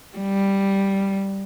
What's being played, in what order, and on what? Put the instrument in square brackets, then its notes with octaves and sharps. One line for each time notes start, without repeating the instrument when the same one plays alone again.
[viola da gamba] G3